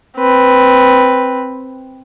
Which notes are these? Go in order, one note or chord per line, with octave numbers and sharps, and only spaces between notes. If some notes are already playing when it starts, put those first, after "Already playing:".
C4 B4